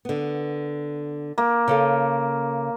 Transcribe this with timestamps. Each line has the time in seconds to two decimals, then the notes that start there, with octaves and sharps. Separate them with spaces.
0.05 D3 B3
1.38 A#3
1.68 C#3 C#4 A4